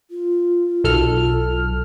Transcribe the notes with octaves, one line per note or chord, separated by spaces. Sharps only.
F4
B1 A4 F6